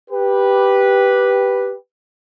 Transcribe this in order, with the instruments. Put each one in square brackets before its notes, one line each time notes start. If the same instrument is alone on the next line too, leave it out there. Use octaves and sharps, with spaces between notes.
[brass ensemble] G4 B4